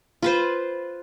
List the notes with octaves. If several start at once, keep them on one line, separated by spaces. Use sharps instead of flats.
F4 B4 C5